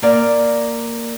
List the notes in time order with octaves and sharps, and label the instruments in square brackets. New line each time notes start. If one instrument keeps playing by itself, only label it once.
[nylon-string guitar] A#3 D5 F5